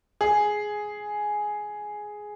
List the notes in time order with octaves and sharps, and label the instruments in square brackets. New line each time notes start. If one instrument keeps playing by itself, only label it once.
[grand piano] G#4